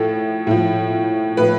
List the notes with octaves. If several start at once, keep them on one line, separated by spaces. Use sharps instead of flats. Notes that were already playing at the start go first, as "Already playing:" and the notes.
Already playing: A2 F3 A4
A2 F3
A2 F3 B4